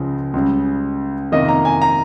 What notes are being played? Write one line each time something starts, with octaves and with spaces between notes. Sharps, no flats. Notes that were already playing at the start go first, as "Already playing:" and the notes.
Already playing: C#2 C#3 F3 G#3
C#2 C#3 G3
F2 C3 D#3 A#3 D#5
A#5
G#5
A#5